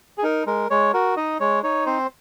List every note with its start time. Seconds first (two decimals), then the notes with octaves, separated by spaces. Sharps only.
0.18 G#4
0.23 D#4 A#4
0.46 G#3 A#4
0.71 G#3 C#5
0.94 F#4 A#4
1.17 D#4 D#5
1.40 G#3 C#5
1.63 D#4 C#5
1.86 C4 C5